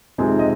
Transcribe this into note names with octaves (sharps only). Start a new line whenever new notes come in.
F2 C3 D#3 G#3 C4
D#5